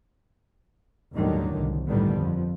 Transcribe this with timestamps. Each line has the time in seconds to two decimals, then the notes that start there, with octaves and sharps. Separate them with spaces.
1.13 G1 D#2 A2 D3 D#3 F#3
1.57 C2
1.86 G1 A2 D3 D#3 G3 B3
2.17 F2